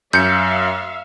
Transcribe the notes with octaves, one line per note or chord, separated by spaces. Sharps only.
F#2 E5 F5 G6 C#7